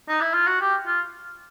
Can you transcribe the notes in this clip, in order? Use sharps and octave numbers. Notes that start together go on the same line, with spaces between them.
D#4
E4
F4
F#4
G4
F4